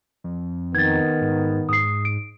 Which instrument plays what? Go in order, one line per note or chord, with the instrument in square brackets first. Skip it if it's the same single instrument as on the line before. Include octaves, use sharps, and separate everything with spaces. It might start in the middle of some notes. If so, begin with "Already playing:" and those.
[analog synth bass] F2
[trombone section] D#3 B3 [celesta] G#6 A6
[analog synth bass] G#2
[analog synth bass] G#2 [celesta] D#6 C7
[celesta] D7